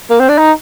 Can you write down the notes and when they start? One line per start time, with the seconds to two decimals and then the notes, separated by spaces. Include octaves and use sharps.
0.10 A#3
0.20 C4
0.29 D4
0.38 D#4